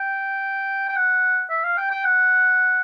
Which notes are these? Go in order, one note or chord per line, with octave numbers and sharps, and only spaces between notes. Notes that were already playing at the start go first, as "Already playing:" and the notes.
Already playing: G5
G5
F#5
E5
F5
G5
G5
F#5